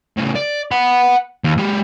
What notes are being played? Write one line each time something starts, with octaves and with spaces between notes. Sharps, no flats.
A2 C#3
D5
F#5 B5
D#2
G#3 G4